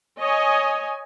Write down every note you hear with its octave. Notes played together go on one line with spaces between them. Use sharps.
C#5 D#5 G#5